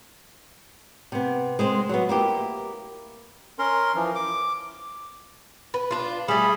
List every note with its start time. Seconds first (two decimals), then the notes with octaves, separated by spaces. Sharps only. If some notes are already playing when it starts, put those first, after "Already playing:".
1.12 C3 B3
1.59 G#3 C4 C5
1.89 F#3 B3
2.09 A#3 E4 G4
3.59 C#4 A#4 C6
3.95 E3 F3
4.15 D6
5.74 B4
5.91 D4 F4
6.28 G3 A3 G#4 B5